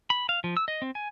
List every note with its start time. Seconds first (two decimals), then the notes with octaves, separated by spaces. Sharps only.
0.10 B5
0.29 F5
0.44 F3
0.57 E6
0.68 D#5
0.82 C4
0.95 G#5